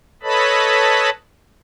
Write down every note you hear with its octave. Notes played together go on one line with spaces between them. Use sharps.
A4 B4 C#5 D#5 A5 B5